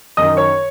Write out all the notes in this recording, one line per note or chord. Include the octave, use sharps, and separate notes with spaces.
F#2 D#3 D#5 D#6
C#5 C#6